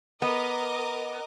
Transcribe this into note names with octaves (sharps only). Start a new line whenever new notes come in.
B3 A#4 D#5 D6